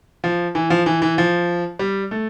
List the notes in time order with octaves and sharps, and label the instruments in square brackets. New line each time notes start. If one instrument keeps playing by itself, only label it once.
[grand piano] F3
E3
F3
E3
E3
F3
G3
A3